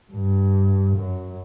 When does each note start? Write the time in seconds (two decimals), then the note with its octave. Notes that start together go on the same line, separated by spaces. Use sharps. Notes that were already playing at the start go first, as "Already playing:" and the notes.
0.12 G2
0.95 F#2